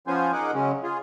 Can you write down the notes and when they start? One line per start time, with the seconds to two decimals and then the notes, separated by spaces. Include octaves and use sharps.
0.07 F3 B3 C#4 F4 C5 G#5
0.33 D#4 G#4 A#4 D#5 F#5 D6
0.54 C#3 F#3 G#3 C#4
0.83 F4 G#4